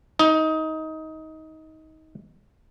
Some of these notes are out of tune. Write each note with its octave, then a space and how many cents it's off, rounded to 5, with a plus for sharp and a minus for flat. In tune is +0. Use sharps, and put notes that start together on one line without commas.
D#4 +20